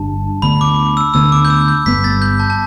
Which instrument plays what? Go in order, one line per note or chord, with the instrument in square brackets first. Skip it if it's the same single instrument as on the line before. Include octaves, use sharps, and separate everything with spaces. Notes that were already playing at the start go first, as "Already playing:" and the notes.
Already playing: [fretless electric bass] G1 G2 G3 D4 [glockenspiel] A5
[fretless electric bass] D2 D3 B3 [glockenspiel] B5
[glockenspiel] D6
E6
[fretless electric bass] D2 D3 B3 [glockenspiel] E6
[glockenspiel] D6
G6
E6
G6
[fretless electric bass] G1 G2 G3 B3 [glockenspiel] B6
[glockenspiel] A6
G6
A5
A5